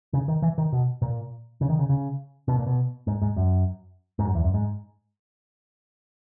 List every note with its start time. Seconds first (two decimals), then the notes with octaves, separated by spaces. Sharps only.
0.13 C#3
0.28 D#3
0.42 E3
0.58 D#3
0.72 B2
1.02 A#2
1.61 C#3
1.70 D#3
1.79 C#3
1.89 C#3
2.48 B2
2.58 A#2
2.67 B2
3.07 G#2
3.22 G#2
3.36 F#2
4.19 G#2
4.25 F#2
4.35 E2
4.44 F#2
4.54 G#2